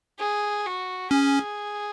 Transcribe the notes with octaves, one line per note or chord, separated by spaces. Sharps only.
G#4
F#4
C#4 G#4